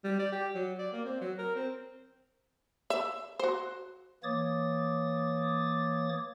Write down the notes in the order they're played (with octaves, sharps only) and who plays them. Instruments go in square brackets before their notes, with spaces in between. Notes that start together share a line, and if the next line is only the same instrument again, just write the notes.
[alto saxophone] G3
D5
G4
F#3
D5
A#3
C4
F#3
A#4
C4
[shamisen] E5
F#4 C5
[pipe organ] E3 A#3 C#5 D6 D#6 A6